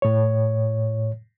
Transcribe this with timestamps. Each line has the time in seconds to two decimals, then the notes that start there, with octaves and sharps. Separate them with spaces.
0.02 A2 C#5